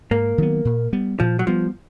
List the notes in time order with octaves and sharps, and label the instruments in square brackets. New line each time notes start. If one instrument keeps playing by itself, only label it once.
[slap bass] G#2 [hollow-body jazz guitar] A#3
[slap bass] D#3 F#3 B3
A#2
G3 B3
[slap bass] A#2 [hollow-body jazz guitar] F3
[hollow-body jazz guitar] F#3
[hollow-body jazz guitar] F3 [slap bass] G3 B3